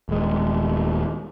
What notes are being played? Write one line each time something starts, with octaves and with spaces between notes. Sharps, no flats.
D#1 G#3